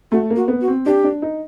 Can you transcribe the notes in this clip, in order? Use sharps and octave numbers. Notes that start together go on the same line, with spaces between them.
A3 F#4
A#3
F#4
B3
F#4
C4
D4 G4
D4
D#4